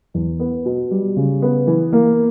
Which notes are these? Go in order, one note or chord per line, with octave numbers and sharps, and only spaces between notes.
E2
B3
B2
G3
C#3
B3
E3
A#3